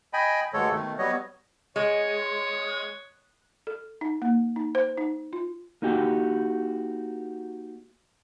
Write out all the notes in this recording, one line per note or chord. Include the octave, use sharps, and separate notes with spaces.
D#5 G5 G#5 B5
D2 G2 D3 G#3 A4 C#5
B2 D#3 A3
F#3 G3 B3 C#5 D#5
G#3 C#5
A4
D#4
A#3
D#4
C5
D#4
F4
A#3 D#4 F#4 G4 G5